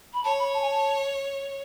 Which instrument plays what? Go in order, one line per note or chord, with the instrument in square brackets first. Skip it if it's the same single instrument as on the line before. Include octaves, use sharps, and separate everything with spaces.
[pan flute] B5
[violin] C#5 [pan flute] A5
[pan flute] B5
A5
G#5
A5